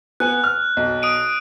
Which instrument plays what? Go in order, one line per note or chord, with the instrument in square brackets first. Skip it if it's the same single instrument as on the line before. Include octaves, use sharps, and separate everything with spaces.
[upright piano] B3 F#5 G#5 [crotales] F#6
[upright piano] F6
B1
[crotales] D#6 D7 D#7